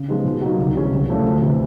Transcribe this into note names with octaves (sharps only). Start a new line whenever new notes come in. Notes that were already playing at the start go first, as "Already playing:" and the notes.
Already playing: C#3
F3 G#3 B3 D#4
B2
F#3 A#3 D#4
C2
C3 E3 G#3 C#4
C2
A#2 F3 A3 C#4
D2
C3 E3